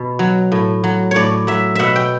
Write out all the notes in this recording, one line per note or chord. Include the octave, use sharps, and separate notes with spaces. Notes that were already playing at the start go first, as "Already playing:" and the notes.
Already playing: B2
F#3
A2
F#3
A2 C#5 D5
F#3 E5
B2 E5 F#5
G5